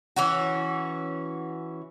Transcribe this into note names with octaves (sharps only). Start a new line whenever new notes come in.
E3 C#4 F#4